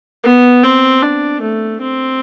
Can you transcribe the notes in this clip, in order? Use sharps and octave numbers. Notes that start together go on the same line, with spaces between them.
B3
C4
D4
A3
C4